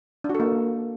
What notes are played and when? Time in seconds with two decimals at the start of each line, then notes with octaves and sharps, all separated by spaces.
0.24 D4
0.29 F#4
0.35 A4
0.40 A#3